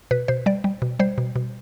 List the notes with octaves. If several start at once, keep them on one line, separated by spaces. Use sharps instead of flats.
B2 B4
B2 C5
G3 D5
G3
B2
G3 C5
B2
B2